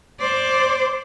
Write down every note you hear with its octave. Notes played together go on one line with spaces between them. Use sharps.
C5 D5